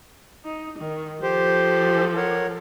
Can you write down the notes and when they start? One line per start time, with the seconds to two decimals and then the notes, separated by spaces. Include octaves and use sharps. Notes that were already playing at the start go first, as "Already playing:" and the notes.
0.45 D#4
0.79 D#3
1.23 F3 G4 A4 C5
2.16 A#4 C#5 F#5